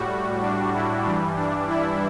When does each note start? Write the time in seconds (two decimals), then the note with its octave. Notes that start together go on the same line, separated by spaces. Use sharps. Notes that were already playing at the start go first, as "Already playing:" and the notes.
Already playing: A2 G3 F#4
0.41 D4
0.73 E4
1.04 G2 E3 G3 D4
1.36 D4
1.68 E4